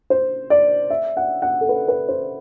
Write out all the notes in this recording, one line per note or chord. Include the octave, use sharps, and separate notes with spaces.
C5
D5
E5
F#5
F#5
A4
B4
B4
C5